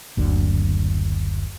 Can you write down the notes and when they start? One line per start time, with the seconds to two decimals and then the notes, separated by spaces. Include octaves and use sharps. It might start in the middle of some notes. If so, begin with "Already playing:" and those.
0.17 F#1 D2 D3